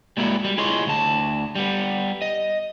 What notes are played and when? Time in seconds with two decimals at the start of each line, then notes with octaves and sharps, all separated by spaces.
0.17 G3 G#3 A#3 E4 F#4 D5
0.44 G3
0.58 E4 F4 G#4 C#5 D#5 C6
0.87 D2 A5
1.55 G3 B3
2.22 D#5